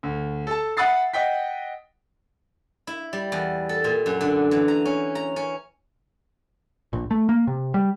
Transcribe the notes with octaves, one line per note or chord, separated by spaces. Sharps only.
D2
A4 A5
E5 F#5 B5 D#6 A6 C7
D#5 F#5 G5 B6
E4
G3
E2
A4
A#2
F#2
D3
E3
A#5
C#4
A#5
C#4
A#1
A3
A#3
C3
G3